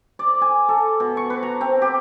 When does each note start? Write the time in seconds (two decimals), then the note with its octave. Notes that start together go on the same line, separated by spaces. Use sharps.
0.19 D5
0.42 G#5
0.69 A4
1.00 B2
1.17 C#6
1.30 B4
1.43 A#5
1.61 C4
1.82 G4